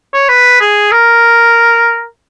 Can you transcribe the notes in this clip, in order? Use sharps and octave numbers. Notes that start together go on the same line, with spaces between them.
C#5
B4
G#4
A#4